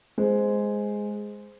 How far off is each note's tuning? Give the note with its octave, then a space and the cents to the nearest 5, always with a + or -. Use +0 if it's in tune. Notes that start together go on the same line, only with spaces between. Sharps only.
G#3 +0 C5 -10